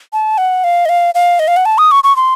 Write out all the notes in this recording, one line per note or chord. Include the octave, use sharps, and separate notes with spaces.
A5
F#5
F5
D#5
F5
F5
D#5
F5
F#5
A5
D#6
C#6
C#6
C6